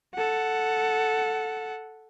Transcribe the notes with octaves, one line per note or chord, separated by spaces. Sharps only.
A4 F#5